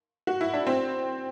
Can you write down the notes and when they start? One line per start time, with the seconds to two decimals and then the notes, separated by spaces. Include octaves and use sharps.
0.27 F#4
0.41 E4
0.54 D4
0.67 C4